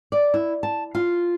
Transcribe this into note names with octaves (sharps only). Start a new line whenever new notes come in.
D5
E4
A5
F4